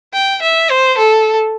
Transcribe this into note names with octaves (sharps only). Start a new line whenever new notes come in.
G5
E5
C5
A4